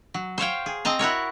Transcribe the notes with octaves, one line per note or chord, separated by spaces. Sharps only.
F#3
C5 C#5 F5 G5
G#4
C4 D#5 A5 A#5
E4 F#4 A#4 C#5